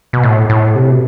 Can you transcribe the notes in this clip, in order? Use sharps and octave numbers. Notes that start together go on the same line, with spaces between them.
B2
A2
A2
C3
B2